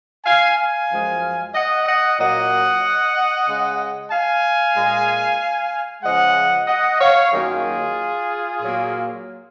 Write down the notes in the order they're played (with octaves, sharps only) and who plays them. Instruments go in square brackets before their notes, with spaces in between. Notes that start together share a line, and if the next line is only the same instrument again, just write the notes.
[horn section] F5 G#5
F5 G#5
F#2 F3 G#3
D#5 F#5
D#5 F#5
A#2 F#3 A#3 D#5 F#5
C#3 G#3
F5 G#5
A#2 G#3
C#3 F3 G#3 D#5 F#5
D#5 F#5
C#5 F5
F#2 D#3 F#3 A#3 F4 G#4
A#2 F#3 A#3